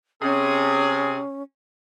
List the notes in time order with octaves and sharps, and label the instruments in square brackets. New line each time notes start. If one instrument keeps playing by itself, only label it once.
[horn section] C3 G#4 [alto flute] C#4